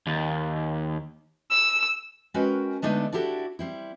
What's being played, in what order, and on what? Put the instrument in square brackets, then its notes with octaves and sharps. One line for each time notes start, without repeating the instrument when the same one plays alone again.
[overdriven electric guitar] D#2
[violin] E6
[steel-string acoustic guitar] G#3 C#4 F#4 A#4 B4 G5
D3 G#3 A3 B3 D4 D#4
D4 E4 F#4 G4 A4
G3 C4 E4